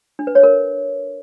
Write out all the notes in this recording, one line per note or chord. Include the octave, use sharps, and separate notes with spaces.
D4
B4
C#5
A#4